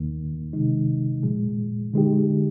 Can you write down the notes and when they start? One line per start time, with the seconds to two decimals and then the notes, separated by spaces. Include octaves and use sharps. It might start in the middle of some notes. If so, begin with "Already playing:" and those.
Already playing: D#2 D#3 A#3
0.53 C3 D#3 G#3 D#4
1.23 A#2 F3 G#3
1.94 D3 G#3 D#4 G4